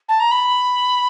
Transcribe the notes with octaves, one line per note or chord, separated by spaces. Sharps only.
A5
A#5
B5